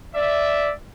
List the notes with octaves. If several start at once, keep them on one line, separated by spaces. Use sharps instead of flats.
D5 E5